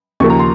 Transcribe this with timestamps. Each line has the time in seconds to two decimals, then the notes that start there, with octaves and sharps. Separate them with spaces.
0.20 D#2 C#3 F3 A#3 C#6
0.30 A#5
0.39 C6